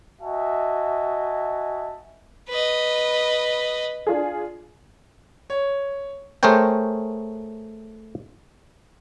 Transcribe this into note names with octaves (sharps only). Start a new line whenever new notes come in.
F#4 D#5 E5 G#5 A5
B4 D#5
D4 F4 G#4
C#5
A3 G#4 A#4 C5 C#5 G5